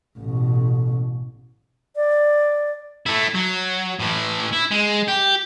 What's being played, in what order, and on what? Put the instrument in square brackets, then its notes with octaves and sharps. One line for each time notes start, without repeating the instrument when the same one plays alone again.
[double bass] A1 B2
[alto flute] D5
[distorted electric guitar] A3 E4
F#3
A2 E3
E4
G#3
G4